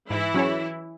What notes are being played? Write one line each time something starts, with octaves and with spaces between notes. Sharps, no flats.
G#2 E3 E4
F#3 C#4 G#4 C#5